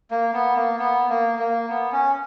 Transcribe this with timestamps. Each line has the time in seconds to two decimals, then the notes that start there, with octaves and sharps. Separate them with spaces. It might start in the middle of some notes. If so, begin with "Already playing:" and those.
0.11 A#3
0.34 B3
0.56 A#3
0.79 B3
1.09 A#3
1.39 A#3
1.69 B3
1.92 C#4